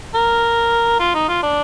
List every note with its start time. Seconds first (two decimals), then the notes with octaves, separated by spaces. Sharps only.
0.15 A#4
1.00 F4
1.14 D#4
1.28 F4
1.43 D4